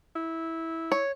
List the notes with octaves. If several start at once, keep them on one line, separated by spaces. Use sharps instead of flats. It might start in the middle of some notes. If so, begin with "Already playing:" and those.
E4
C#5